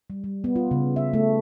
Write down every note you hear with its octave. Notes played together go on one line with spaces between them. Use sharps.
G3
G3
B3
F4
C#3
E5
A3